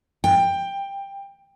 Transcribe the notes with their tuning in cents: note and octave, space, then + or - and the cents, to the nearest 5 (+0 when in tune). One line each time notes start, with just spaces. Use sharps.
G5 +15